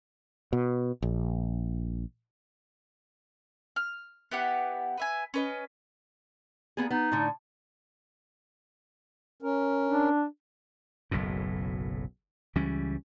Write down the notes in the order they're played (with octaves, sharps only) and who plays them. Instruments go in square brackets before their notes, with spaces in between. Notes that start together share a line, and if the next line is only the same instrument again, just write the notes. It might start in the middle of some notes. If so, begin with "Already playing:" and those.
[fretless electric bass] B2
A#1
[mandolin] F6
B3 E4 G4 F#5
B4 E5 G#5
C#4 B4 D#5
[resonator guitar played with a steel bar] A#3 B3 G#4
[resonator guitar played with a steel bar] B3 [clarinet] D#4
[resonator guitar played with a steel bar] A2 D3
[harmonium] C#4 A#4
[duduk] D4
[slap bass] F#1 B1 F#2 A2
C#2 E3 G3 C#4